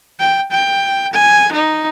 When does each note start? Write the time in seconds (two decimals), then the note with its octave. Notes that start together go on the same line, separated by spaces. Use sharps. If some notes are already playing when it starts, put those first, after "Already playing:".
0.20 G5
0.51 G5
1.13 G#5
1.52 D#4